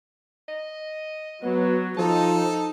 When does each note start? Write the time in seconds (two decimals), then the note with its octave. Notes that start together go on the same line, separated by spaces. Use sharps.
0.49 D#5
1.44 F#3 B3
1.97 F3 D#4 A4 A5